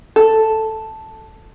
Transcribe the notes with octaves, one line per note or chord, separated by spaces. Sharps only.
A4